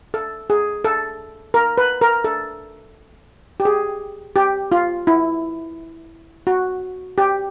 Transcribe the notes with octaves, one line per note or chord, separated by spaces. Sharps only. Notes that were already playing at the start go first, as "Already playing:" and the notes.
A4
G#4
A4
A#4
B4
A#4
A4
G4
G#4
G4
F4
E4
F#4
G4